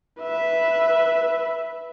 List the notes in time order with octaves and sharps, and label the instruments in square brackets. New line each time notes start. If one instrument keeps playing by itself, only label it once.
[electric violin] B4 E5